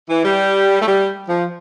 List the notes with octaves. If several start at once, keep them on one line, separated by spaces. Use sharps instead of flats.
E3
G3
A3
G3
F3